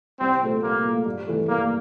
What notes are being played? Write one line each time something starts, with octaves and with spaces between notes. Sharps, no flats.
C2 C4
A#2 A3
C2 A#3
A#2 A3
G2
E3 A3 E4 A4
G2 A#3